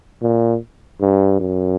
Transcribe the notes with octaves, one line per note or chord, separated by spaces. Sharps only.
A#2
G2
F#2